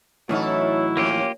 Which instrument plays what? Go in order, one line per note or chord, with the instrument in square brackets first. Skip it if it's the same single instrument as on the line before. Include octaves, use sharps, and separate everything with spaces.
[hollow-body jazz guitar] A2 E3 D#4 [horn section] F#3 E4 [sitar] C#4 A4
[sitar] F3 C#4 [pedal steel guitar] A#3 F4 G4